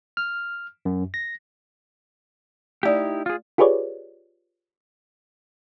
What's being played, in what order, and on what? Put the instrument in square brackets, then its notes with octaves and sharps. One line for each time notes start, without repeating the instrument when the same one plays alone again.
[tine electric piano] F6
F#2
A#6
[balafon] A3 D5 [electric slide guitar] D#4 E4 G4
[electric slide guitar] F4 G#4
[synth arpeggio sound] F4 G4 G#4 B4 C#5 D5